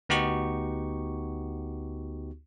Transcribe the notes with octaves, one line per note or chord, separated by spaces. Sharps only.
D2 B3 D#4 F#4 G4 C#6